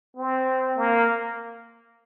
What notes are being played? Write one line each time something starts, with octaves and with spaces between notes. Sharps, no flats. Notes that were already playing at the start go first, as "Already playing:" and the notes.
C4
A#3